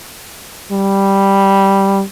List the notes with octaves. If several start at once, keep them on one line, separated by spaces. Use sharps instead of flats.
G3